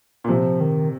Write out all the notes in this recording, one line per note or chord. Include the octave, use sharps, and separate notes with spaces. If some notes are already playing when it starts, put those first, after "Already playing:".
A#2
C3 F3
D#3